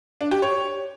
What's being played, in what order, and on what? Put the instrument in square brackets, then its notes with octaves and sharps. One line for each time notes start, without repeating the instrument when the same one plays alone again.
[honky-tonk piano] D4
G4
C#5